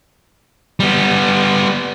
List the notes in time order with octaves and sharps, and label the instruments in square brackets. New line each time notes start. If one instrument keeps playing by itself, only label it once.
[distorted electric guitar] G3 B3